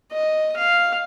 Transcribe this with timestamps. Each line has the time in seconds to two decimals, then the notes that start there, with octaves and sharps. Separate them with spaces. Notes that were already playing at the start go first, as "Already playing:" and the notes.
0.12 D#5
0.57 F5